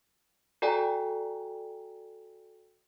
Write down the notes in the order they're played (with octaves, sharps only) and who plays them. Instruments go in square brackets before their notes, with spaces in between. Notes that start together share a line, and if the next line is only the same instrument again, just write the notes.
[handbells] F#4 A4 D5 G5 G#5 A#5